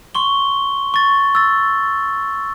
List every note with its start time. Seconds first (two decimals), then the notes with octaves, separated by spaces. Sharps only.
0.15 C6 C#6 G7
0.94 C#6 A6
1.35 E6 A6